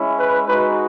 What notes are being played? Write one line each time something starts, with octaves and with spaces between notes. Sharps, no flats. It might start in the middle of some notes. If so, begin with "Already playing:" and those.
Already playing: G#3 C#4 E4
B4
G#3 D#4 F#4 B4